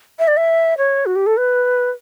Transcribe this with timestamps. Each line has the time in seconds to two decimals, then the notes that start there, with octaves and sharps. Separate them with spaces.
0.19 E5
0.28 D5
0.37 E5
0.78 C#5
1.06 F#4
1.16 G4
1.26 A4
1.37 B4